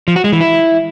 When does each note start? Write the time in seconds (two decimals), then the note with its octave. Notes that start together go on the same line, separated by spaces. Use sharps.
0.08 F3
0.16 F#4
0.24 G#3
0.32 E3
0.41 E4